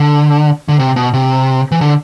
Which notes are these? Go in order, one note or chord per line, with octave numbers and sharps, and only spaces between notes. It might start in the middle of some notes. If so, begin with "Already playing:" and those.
Already playing: D3
D3
C3
B2
C3
E3
D3